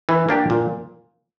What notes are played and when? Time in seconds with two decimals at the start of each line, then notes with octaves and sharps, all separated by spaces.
0.09 E3
0.29 A#3 D4 G4
0.50 A#2